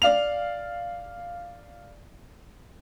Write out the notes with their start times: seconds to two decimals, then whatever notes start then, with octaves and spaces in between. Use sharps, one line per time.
0.02 D5 F5 F7